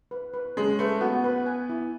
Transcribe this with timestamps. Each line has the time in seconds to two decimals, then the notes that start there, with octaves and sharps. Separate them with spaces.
0.11 B4
0.34 B4
0.57 G#3 C#4
0.79 A3 B4
1.01 B3 F#4
1.24 B4
1.46 G#5
1.69 E4